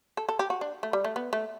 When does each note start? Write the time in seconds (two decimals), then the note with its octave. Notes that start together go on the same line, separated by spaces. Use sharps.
0.17 A4
0.29 A4
0.39 G4
0.50 F#4
0.61 D4
0.83 A3
0.93 G3
1.04 A3
1.16 B3
1.33 A3